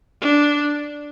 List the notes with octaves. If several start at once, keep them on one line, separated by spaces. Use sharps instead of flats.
D4